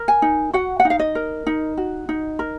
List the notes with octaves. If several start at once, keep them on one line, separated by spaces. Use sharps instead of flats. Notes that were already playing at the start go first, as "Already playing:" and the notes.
Already playing: A#4
G#5
D#4
F#4 F#5
F#5
D#4
F5
D#5
A#4
D#4
F#4
D#4
A#4